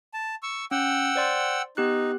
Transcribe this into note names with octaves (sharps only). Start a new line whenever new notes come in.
A5
C#6 E6
C#4 F#5 G5 E6
C5 D5 C6
B3 D#4 G4 F#6